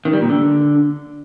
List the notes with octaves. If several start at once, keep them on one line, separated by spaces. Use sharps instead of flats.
D#3
G3
A#2
D3